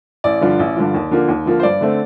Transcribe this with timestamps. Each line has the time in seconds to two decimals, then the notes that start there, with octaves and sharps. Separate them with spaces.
0.24 A1 D5
0.41 G2 D3 F3
0.60 A1
0.76 G2 D3 F3
0.94 D#2
1.11 D3 F3 A#3
1.28 D#2
1.46 D3 F3 A#3
1.60 C5
1.63 G2 D5
1.81 D3 A3 C4